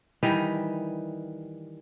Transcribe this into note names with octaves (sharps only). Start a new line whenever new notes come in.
D#3 E3 G3 D#4